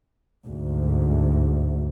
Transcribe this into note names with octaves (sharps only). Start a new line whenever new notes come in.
D2 G#2